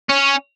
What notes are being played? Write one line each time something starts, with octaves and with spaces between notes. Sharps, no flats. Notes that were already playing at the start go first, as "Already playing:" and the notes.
C#4